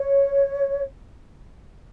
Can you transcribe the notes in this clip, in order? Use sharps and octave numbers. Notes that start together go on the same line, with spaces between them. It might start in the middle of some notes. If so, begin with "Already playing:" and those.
Already playing: C#5